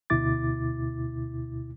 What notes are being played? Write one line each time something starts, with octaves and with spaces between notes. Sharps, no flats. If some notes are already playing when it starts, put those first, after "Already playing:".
D2 B2 E4 D6 A6